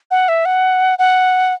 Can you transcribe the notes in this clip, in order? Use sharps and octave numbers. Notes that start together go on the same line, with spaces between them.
F#5
E5
F#5
F#5